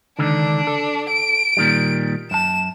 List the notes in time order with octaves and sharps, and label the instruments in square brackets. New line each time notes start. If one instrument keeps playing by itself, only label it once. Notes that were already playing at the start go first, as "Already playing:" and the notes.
[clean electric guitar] C#2 D3 D#3 [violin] D4
[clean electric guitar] A4
[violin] D7
[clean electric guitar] A#2 D#3 G3
[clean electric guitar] F#2 A5 [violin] E7